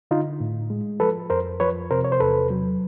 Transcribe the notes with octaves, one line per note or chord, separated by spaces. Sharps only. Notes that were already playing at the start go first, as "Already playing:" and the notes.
D3 D#4 F4
A2
G#3
F3 A4 B4
F2 A#4 C5
F3 B4 C#5
C3 A#4 C5
C#5
C5
E2 A4 B4
F#3